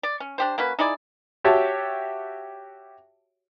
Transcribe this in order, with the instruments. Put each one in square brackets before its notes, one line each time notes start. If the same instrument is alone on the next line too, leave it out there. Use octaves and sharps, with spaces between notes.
[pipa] D5
C#4
D4 G4 C5
A#3 C#4 F#4 B4
D#4 E4 G#4 D5
[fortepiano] F#4 G4 C#5 E5 A5